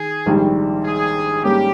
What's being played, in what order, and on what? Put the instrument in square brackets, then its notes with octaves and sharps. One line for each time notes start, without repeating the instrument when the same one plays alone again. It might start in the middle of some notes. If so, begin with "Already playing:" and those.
Already playing: [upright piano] D#3 [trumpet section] G#4
[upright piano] A#1 G#2 D#3 G3
[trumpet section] G#4
[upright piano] G#2 G3 A#3 C#4 [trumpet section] G4